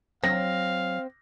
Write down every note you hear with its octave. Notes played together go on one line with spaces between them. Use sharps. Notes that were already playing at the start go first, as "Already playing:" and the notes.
F#3 C4 F5 A#6